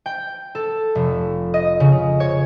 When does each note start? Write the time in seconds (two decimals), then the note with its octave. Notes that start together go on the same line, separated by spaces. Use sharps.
0.06 G5
0.55 A4
0.95 F1
1.54 D#5
1.80 C#3
2.20 C#5